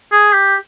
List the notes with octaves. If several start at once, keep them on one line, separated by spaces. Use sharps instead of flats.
G#4
G4